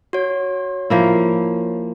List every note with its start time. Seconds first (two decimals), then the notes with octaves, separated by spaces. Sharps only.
0.13 F#4 C#5
0.90 F3 A#3 E4